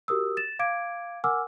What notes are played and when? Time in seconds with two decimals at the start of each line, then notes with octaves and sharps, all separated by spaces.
0.08 F#4 G4 A#4 D#6 E6
0.37 A6 E7
0.59 F5 D6 G#6 D7
1.24 A#4 F#5 G#5 D6 E6 F6